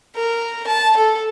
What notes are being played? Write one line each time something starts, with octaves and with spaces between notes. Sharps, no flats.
A#4
A5
A4